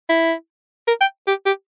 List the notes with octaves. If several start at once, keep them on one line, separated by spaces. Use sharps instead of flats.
E4
A#4
G5
G4
G4